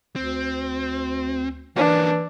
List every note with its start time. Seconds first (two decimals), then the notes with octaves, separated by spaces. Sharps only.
0.16 D2 C4
1.76 E3 A#3 C#4 D4